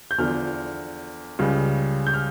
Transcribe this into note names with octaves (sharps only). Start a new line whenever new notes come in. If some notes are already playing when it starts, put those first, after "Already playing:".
G6
E2 D3 F3 F6
C#2 C#3 G3
G6
F6